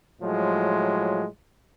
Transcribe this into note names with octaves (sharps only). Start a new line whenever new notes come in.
A2 F3 F#3 G#3